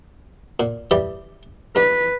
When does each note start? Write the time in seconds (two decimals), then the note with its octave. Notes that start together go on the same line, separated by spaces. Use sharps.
0.60 A#2
0.91 E3 G3 G4
1.76 G2 B4